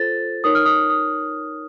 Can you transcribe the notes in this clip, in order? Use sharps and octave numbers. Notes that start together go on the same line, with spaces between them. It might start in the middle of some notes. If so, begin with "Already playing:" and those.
Already playing: F4 A4 C5 A6
D#4 A#4 C#5 D#6
F6
D#6
D#6